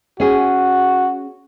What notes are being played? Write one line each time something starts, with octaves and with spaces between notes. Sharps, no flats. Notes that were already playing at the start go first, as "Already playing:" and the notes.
C#4 F#4 G#4